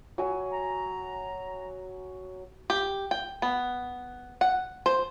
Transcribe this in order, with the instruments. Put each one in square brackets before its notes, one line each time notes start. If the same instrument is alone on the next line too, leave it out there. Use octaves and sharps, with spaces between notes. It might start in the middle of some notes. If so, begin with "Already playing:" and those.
[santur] F#3 G#5
[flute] A#5
[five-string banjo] G4
G5
B3
F#5
C5